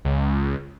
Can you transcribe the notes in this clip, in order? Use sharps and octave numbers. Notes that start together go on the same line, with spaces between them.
C#2